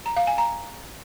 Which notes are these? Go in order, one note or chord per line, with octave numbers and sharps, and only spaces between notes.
A#5
F5
G#5
A#5